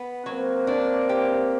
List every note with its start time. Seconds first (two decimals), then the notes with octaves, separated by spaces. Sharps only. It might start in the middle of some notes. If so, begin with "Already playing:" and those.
Already playing: B3
0.25 F#3 A#3 C4
0.67 D4
1.09 G4